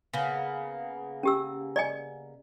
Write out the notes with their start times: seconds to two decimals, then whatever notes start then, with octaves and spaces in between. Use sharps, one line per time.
0.13 C#3 A#3 B3
1.23 C#4 G4 E6
1.76 D5 D#5 G#5